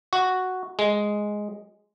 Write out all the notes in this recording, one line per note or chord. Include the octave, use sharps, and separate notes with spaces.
F#4
G#3